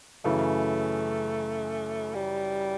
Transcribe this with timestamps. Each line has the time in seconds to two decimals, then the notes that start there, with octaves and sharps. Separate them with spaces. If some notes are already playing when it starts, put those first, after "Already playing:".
0.24 F#2 C#3 E3 A3
2.14 G3